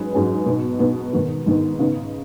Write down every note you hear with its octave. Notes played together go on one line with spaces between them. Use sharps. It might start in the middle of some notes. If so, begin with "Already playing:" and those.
Already playing: G#2 F#3 C#4 G#4 B4
G#2 F#3 C#4 G#4 B4
B2 B3 D#4
B2 B3 D#4
G#2 D#3 B3 D#4
G#2 D#3 B3 D#4
C#3 B3 D#4